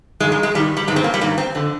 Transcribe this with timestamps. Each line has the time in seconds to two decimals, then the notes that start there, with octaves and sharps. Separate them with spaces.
0.20 G2 G#3
0.24 D#3
0.32 G#3
0.43 G#3
0.54 G2 D#3 G3
0.77 G3
0.87 G2 G#3
0.91 D#3 C4
1.04 A#3
1.14 G3
1.21 G2 D#3 A#3
1.38 C4
1.55 F2 D3